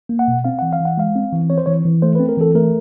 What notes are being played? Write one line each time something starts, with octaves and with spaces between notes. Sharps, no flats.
A#3
F#5
B2
C4 F5
E3 F#5
F5
E3
F#5
G#3 F5
C4
E3
C4 C#5
C5
E3 C#5
E3
A3 C5
B4
C4
A#4
E3 A4
A3 A#4